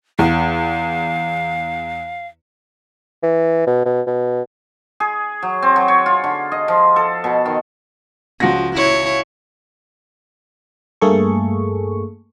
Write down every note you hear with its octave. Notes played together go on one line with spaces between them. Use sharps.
E2 F5
E3
B2
B2
B2
G#4
F#3
C4
F#3
C#5
F4
D3
D#5
F3
A4
B2
D#3
C#2 F3 F#4 A#6
E4 C#5
G2 A3 A#3 G#4 A4 C#6